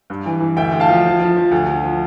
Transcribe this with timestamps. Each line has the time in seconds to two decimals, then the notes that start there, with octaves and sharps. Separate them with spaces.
0.10 G2
0.26 E3
0.40 E3
0.56 D2 E5 G5
0.72 D2
0.80 F5 A5
0.89 F3
1.05 F3
1.20 F3
1.37 F3
1.51 D2
1.68 D2
1.84 F3